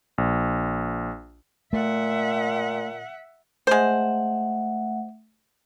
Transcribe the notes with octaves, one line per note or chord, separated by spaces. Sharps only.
A#1
A#2 A3 E5 F#5
G#3 A3 C5 E5 F#5